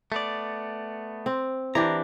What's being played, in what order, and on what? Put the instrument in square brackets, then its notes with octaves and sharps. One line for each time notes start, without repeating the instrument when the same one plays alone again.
[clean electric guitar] A3 B3 D5
[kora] C4
[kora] E3 D4 G4 [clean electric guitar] A#5